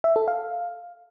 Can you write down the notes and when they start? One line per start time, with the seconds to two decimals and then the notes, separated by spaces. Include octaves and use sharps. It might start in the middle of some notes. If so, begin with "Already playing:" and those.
0.04 E5
0.16 A4
0.28 F5